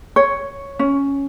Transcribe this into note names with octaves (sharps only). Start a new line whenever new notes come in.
C#5
C#4